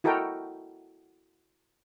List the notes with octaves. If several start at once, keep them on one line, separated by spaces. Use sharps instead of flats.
E4 F#4 A4 A#4 D#5 G5